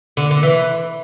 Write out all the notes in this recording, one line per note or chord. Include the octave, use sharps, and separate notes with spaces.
D3
D3
E3